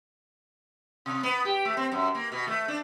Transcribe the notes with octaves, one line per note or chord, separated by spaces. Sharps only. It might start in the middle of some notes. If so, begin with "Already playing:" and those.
C3
B3
G4
A3
C4
F#2
A#3
B2
A3
D4